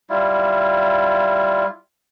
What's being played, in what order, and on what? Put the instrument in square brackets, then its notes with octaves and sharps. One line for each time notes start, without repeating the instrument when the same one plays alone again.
[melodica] G3 E4 F4